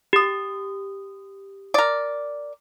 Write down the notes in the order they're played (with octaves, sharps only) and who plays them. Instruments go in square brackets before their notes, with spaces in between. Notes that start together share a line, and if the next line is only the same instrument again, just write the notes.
[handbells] G4 D#6
[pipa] A#4 D5